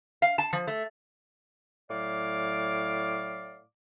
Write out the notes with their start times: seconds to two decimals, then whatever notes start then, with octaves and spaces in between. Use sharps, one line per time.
0.22 F5
0.38 A5
0.53 F3
0.67 A3
1.91 A2 F#3 D5 F5 D6